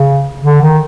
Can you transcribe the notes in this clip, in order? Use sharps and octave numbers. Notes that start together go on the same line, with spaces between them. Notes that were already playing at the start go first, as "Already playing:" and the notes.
Already playing: C#3
D3
D#3